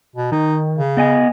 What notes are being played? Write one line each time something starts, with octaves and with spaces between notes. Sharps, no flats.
B2
D#3 D#4
C#3
B3 D#5 G#5